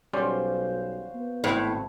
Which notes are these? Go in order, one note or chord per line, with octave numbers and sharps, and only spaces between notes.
B1 G3 C#4 F#4 C5 D5 F5
B3
G#1 A2 C4 B4